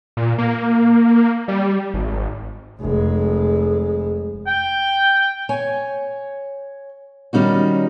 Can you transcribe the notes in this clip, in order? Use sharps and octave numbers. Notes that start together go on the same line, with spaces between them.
A#2
A#3
G3
G#1
F1 G#3
G5
C#5 G#5
D#3 G3 C#4 D#4 F#4